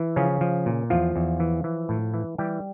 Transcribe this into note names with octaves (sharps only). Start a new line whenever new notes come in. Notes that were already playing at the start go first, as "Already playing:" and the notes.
Already playing: E3
C#3 F3 C#4
F3
A#2
E2 F3 F4
E2
E3
E3
A2
E3
E3 G3 G4